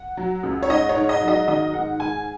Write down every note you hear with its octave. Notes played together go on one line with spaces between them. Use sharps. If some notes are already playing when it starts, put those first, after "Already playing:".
Already playing: F#5
F#3
C#2
C#5
G#2 D#5
C#5
G#2
D#5
F#3
D#5
D#3 D#5
G#2 F#5
G#2 G#5